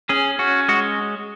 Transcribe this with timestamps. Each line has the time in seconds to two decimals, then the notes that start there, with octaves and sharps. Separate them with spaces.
0.09 C#4 G#4
0.39 C#4 F#4
0.68 G#3 F#4